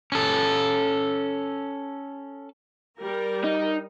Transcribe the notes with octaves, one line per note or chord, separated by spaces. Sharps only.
C#4 A4
G3 A#4
D#4